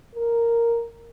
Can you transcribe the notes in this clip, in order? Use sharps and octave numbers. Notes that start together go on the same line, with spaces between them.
A#4